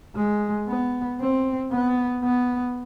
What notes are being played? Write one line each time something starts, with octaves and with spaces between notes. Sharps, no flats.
G#3
B3
C4
B3
B3